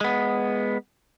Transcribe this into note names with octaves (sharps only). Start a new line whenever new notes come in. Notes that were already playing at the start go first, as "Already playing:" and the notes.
G#3 B3